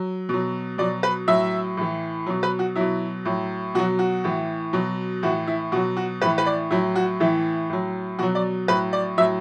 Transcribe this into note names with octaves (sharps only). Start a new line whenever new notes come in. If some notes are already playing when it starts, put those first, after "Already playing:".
Already playing: F#3
B2 F#3
B2 F#3 D5
B4
A2 F#3 E5
A2 E3
B2 F#3
B4
F#4
B2 F#3 E4
A2 F#3
B2 F#3 F#4
F#4
A2 E3
B2 F#3
A2 E3 F#4
E4
B2 F#3 F#4
F#4
A2 E3 B4
B4
D5
A2 F#3 E4
F#4
A2 E3 E4
A2 F#3
B2 F#3 F#4
D5
A2 F#3 B4
D5
A2 F#3 E5